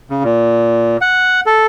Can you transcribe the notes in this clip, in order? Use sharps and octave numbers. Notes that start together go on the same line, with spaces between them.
C#3
A#2
F#5
A4